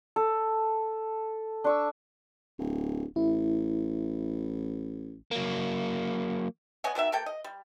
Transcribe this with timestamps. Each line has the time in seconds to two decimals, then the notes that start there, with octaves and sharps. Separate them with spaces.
0.16 A4
1.64 D4 C#6 E6
2.58 D1
3.16 A1 E4
5.31 F#3 A#3
6.84 B3 C#5 D#5 G#5
6.95 B2 D#3 D4 E5
7.12 A#3 G4 A4 G5
7.26 D#5
7.44 G3